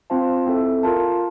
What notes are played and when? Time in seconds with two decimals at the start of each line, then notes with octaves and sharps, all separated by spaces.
0.10 C4 F4 C5 F5 A5
0.47 C4 E4 A4 E5
0.83 F4 A#4 F5 A5